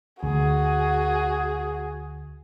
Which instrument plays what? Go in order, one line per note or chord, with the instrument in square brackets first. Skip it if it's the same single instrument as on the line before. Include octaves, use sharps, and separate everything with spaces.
[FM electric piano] D2 [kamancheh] F#4 G#4